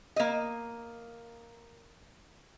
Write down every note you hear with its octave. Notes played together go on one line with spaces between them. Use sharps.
A#3 D#5